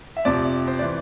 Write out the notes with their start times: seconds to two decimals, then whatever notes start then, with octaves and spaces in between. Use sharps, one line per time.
0.17 E5
0.25 F2 C3 F3 D5
0.67 C5
0.79 E3 D5